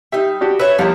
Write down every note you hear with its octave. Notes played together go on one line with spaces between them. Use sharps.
G3 D#4 E5
D4 F#4 G4
B4 C#5 E5
E2 F3 G3 A#3 D#4